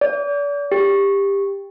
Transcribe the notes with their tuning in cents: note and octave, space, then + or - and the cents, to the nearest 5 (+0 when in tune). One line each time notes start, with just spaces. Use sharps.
D5 -40
G4 +20